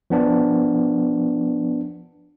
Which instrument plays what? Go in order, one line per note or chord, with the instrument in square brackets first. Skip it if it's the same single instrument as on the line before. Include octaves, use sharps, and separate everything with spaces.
[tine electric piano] F3 B3 D4